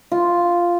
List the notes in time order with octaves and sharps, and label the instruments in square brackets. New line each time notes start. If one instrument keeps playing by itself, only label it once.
[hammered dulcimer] F4